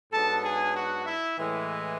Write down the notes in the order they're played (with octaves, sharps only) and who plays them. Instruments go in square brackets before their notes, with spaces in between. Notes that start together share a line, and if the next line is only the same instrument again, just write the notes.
[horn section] G#2 F#3 B3 D4 A4 A5
G#4 G#5
F#4 F#5
E4 E5
A2 E3 G#3